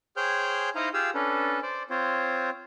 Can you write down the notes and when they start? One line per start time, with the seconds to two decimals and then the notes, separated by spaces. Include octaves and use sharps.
0.17 G#4 C5 C#5 G5 F6 G6
0.75 D#4 E4 C5 D#5 F5 A#5
0.94 F4 G4 G#4 F5 E6
1.14 C#4 D4 A4 B4
1.62 C5 D5
1.90 C4 F4 C5 C#5